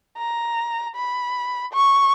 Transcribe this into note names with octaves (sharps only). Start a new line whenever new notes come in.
A#5
B5
C#6